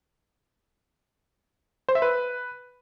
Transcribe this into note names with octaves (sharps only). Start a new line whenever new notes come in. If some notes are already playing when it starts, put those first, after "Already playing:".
C5
E5
B4